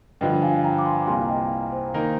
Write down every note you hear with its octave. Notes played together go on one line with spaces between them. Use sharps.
G2 D3 F3 D#5 G5
F5 G#5
G5 A#5
D6
G#5 C6
C2 C3 G3 A#3 F4 G#5 C6
D#5 G5
C5
D#3 A#3 D#4 A#4